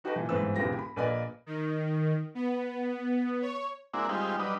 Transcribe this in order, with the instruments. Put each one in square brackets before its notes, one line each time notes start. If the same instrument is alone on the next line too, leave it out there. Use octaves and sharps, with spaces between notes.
[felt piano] D#4 F#4 G4 A4 B4 D#5
A#2 E3
G1 G#2 E3 C4 B4 E6
E1 C#2 E3 B3 G4 A#6
B5
A#1 A#3 B4 D5 D#5 G#5
[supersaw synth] D#3
B3
C#5
[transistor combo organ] G#3 A#3 C4 D4 E4 F#4
G3 G#3 C4 D#4 F4 G4
F#3 G3 D4 B4 D#5